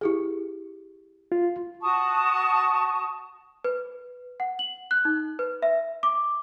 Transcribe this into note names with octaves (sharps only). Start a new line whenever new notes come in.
E4 G4 G#4
F4
F#4 A5 C#6 D#6
B4
F#5
F#7
F#6
D#4
B4
E5
D6